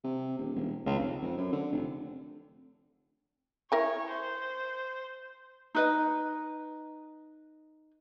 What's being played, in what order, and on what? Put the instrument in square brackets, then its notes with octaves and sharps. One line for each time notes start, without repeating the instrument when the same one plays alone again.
[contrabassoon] C3
D#1
E1
C#2
F1
F2
F#2
D3
F1
[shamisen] E4 A#4 G5 [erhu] C#5
[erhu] C5
[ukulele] D#4 B4 D#5